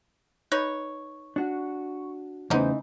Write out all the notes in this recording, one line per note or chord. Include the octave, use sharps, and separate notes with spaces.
D#4 B4 C#5
D4 F#4 C#6
E2 C#3 E3 A3 B3 C#4 D#4 C5